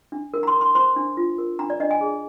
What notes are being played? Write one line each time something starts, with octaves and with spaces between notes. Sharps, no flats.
D4
A#4
A#5
C6
A#4
C6
C5 C6
D4
F4
A#4
D4 A#5
D5
D4 D#5
G#5
G#4